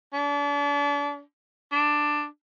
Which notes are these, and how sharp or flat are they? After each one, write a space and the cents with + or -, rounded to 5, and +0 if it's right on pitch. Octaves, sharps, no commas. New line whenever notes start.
D4 -35
D4 +10